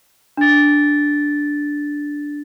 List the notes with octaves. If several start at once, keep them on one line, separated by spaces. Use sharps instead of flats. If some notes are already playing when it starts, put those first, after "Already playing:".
D4 A6